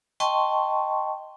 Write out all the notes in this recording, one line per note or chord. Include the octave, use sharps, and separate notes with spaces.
D#5 G5 A5 C6 C#6